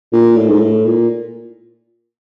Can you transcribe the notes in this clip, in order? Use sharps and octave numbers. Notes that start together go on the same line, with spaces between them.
A#2
A2
G#2
A2
A#2